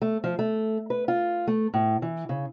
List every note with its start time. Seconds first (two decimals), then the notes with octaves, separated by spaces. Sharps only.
0.02 A3
0.24 F3
0.39 A3
0.90 B4
1.08 F4
1.47 A3
1.74 A2
2.02 E3
2.29 C#3